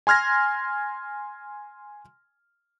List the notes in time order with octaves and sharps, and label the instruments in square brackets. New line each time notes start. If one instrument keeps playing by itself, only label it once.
[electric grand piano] G#5 C6 F6 G#6 A#6